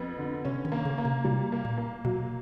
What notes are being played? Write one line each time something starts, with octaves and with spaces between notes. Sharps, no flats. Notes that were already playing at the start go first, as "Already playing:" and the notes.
Already playing: F2 B3
D3
C3 C#4
D#3
A#3
C#3
A#3
C3
C3 G3
A#3
A#2
A#3
B2 F#3